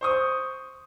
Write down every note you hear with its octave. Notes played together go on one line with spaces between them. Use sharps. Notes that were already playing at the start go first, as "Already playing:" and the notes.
C5 C#6 D#6